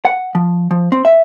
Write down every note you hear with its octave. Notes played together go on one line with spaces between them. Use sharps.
F#5
F3
F3
C4
E5